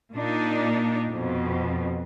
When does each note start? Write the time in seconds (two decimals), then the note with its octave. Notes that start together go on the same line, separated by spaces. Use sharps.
0.12 A#2 A#3 D4 D#4
1.09 F2 B2